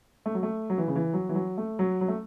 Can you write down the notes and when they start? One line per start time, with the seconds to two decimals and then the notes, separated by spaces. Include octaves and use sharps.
0.26 A3
0.35 F#3
0.43 A3
0.70 F#3
0.78 E3
0.88 C#3
0.96 E3
1.13 F#3
1.29 E3
1.35 F#3
1.58 A3
1.79 F#3
2.01 F#3
2.08 A3